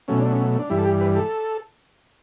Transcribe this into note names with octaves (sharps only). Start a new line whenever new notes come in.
B2 F#3 A3 C#4
D4
C#4
D4
G2 E3 G3 E4
A4
G4
B4
A4